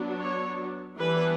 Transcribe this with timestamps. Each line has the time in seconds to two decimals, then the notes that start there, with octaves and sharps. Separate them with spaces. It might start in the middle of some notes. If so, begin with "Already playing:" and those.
Already playing: F#3 B3 D4
0.19 C#5
0.97 E3 G3 B3 D4 B4